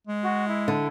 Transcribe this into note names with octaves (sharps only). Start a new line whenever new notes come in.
G#3
F#4
E4
D3